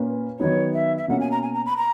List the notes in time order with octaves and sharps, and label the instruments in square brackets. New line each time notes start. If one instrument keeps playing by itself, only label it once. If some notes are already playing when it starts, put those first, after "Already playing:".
Already playing: [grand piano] A#2 A#3 C#4 B4
[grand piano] D#3 F#3 B3 D#4 [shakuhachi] C#5
[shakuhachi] E5
E5
[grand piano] B2 A#3 C#4 [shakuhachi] F#5
[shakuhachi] G#5
A#5
G#5
A#5
B5
A#5